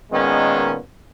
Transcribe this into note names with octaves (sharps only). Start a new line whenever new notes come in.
A#2 D#3 G#3 B3 C#4